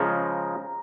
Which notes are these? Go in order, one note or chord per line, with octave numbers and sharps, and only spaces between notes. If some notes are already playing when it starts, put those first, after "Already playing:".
Already playing: C#3 F3 G#3 C#4 A#5